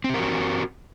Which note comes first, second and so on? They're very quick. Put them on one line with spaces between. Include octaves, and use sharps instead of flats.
C4 G4 A#4 F#4